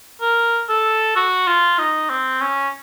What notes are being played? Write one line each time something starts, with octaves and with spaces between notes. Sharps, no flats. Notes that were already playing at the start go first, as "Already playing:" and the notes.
A#4
A4
F#4
F4
D#4
C4
C#4